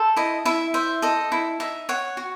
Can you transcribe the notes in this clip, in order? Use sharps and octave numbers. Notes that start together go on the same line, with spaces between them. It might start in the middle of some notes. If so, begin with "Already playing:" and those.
Already playing: A4 C5
E4 D#5
E4 E5
C5 E5
A4 D#5
E4
D#4 E5
C#5 F#5
F#4